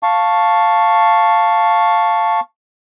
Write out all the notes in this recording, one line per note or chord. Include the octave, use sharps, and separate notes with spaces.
F5 A5 C#6